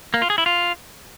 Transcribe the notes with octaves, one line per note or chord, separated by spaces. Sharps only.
A#3
F4
G#4
E4
F4